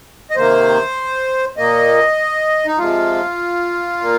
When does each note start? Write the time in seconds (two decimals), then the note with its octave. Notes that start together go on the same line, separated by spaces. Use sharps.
0.31 D#5
0.36 C3 D#3 A#3 C5
1.57 A#2 A#3 D#5
2.66 D#4
2.78 C3 F3 G#3 F4
4.01 A#2 A#3